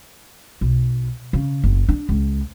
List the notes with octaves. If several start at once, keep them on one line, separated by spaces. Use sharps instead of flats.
B1
C#3
F#1
D4
C#2